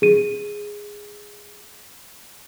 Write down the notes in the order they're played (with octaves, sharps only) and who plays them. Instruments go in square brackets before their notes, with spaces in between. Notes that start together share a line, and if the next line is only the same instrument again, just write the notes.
[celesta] G#4 D#7